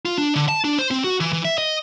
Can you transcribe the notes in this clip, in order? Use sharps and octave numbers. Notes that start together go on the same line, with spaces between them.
F4
D4
D3
A5
D4
C5
C4
F#4
E3
E3
E5
D#5